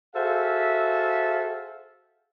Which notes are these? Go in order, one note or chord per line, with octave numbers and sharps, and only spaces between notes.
F#4 G#4 A4 C5 E5 F5